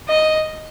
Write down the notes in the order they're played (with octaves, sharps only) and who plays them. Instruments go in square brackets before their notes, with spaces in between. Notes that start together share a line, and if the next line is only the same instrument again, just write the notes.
[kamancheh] D#5